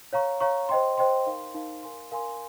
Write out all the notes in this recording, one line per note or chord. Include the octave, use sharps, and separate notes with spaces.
C#5 F5 A#5 C#6
C#5 F5 A#5 C#6
C5 D#5 G5 C6
C5 D#5 G5 C6
D#4 A#4 F5 C6
D#4 A#4 F5 C6
A#4 F5 G#5 C6
A#4 F5 G#5 C6